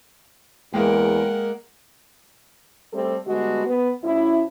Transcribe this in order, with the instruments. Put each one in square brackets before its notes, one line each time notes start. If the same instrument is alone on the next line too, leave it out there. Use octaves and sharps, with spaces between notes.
[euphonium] E2 [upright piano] G#3 A#3 [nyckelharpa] A#4 F#5 [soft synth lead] G5
[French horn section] G3 A3 C4 G4 A4
D3 G3 G#3 B3 F#4
B3
D2 C#4 E4